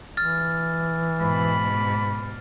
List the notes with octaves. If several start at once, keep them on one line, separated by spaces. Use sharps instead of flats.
E3 F6 A6
G#2 B2 B5